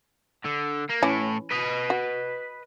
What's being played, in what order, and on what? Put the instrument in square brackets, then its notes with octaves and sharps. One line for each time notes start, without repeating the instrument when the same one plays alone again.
[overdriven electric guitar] D3
A#3
[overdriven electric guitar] A2 [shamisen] E3 C#4
[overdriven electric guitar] B4 D#5
[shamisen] F#4